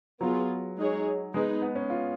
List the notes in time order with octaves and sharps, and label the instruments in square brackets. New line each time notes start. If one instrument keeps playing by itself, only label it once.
[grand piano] F#3 [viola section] B3 F4 G#4
[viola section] G#3 D#4 G#4 C#5
[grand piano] G#3 [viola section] B3 D#4 G#4 B4
[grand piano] B3
C#4
F4